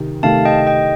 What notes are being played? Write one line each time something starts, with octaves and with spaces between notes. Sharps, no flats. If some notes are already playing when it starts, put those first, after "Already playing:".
Already playing: C3 D#3
C3 D#3 A3 F5 A5
D#5 G5
D#5 G5